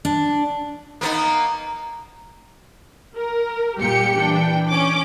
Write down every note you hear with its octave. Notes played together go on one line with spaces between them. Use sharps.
D4
A#3 B3 D#4
A#4
A#2 G3 G4 G5 C#7
E3 D4 G5
C#4 D6